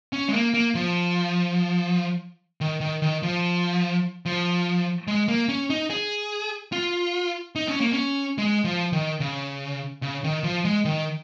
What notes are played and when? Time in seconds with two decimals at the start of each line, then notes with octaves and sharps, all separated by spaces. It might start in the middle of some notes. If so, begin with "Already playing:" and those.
0.13 C#4
0.28 G#3
0.33 A#3
0.54 A#3
0.75 F3
2.61 D#3
2.81 D#3
3.02 D#3
3.23 F3
4.26 F3
5.07 G#3
5.28 A#3
5.48 C#4
5.70 D#4
5.90 G#4
6.72 F4
7.56 D#4
7.68 C#4
7.81 A#3
7.93 C#4
8.38 G#3
8.64 F3
8.92 D#3
9.20 C#3
10.02 C#3
10.24 D#3
10.44 F3
10.65 G#3
10.85 D#3